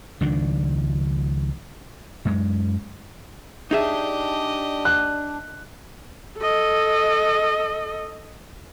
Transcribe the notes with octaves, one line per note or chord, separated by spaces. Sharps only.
C#2 D#3 F3 D4
F#2 G#3
D4 D#4 G4 G#4 D#5 E5
F#6
A4 D#5